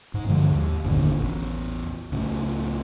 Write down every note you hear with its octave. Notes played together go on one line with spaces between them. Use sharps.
G#2
G2 D3 F3 G#3
D#2
F#1 D#2 A#2 D3
A1 E2
C#2 A2